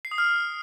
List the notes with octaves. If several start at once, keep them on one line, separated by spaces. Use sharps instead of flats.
C7
D#6
F6